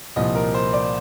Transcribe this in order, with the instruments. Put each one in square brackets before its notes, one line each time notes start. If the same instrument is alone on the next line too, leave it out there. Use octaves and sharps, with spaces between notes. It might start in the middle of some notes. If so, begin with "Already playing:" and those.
[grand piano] C2 A#2 F3 D#5
A#4
C5
D5